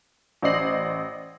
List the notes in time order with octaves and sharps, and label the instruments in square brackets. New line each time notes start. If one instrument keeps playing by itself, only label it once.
[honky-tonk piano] A1 C5 D5 D#5 C7 F#7